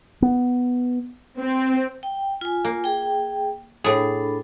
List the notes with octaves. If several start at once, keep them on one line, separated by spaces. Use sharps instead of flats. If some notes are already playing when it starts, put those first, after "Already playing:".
B3
C4
G5
F4 G#5
A#3
G#4 G5
A2 D4 G#4 A4 B5